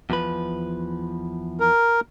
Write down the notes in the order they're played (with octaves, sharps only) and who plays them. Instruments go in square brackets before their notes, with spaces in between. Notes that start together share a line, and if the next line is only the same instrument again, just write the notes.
[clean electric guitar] E2 F3 B4
[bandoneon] A#4